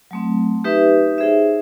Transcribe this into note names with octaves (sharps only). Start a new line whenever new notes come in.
F#3 A3 C4
D#4 G4 B4 E5
D#4 G#4 C5 E5